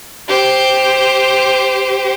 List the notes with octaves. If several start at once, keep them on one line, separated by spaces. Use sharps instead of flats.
G4 C5